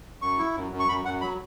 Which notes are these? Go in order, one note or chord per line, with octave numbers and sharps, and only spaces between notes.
F#2 C#6
E4
F#2
F#2
C#6
F#2 B5
F#2 F#5
F#3 B5